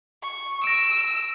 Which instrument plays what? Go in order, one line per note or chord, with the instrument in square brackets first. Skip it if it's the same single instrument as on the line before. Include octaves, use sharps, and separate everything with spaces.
[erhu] C#6
[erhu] E6 [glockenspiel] A#6 D7